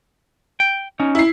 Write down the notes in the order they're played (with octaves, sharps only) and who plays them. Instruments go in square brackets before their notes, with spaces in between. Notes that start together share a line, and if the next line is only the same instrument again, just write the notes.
[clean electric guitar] G5
C#4 D#4
[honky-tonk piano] E4 C7